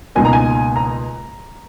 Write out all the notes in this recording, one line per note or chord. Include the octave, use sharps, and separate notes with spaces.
C#2 B2 A#3 D#4 G#5
A#5
G#5
A#5